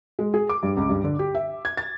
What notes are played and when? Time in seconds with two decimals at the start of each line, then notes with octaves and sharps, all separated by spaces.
0.19 G#3
0.34 G#4
0.49 D6
0.63 G2
0.77 C#2
0.89 G2
1.04 D3
1.19 G4
1.35 E5
1.65 G#6
1.77 A6